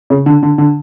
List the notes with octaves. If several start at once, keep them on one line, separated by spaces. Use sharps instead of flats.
C#3
D3
D3
D3